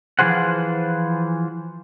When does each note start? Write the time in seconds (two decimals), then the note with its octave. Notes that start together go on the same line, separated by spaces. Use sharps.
0.19 E3 F3 F4 G#4 C5 F#5